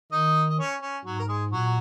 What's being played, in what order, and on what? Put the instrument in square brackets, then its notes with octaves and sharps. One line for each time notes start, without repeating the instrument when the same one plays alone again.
[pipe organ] D#3 [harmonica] D#4 D#5
[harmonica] D#5
C#4 C#5
C#4
[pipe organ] G#2 [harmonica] F#3 F#4
[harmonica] A#4
G#3 G#4
[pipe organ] A#2 [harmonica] F#3 F#4